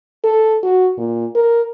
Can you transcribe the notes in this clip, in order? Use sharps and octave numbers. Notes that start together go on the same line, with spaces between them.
A4
F#4
A#2
A#4